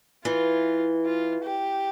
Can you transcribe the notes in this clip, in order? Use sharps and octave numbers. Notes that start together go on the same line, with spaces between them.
E3 F4
F4
G4